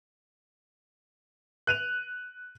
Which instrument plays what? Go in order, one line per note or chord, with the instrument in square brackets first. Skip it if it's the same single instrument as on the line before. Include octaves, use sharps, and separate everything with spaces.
[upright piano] F#6 D#7 F7